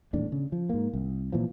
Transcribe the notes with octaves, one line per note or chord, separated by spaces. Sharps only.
D#1 E2 A2 D4
C#3
F3
G#2 A#3
C2
A#2 E3 F3